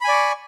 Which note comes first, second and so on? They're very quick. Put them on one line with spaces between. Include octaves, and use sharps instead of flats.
B5 G#5 D5 C#6